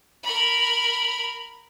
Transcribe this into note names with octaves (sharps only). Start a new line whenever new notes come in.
A#4 B5